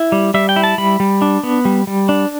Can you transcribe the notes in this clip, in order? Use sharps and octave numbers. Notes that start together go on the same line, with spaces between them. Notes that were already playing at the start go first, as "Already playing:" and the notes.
Already playing: E4
G3
G3 E5
G5
E4
A5
G3 B5
G3
D4
B3
G3
G3
D4